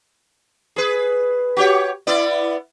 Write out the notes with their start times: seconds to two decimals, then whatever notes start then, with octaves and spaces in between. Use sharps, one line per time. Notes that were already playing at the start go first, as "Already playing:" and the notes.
0.76 G#4 B4
1.57 F#4 G4 C#5
2.07 B3 E4 D5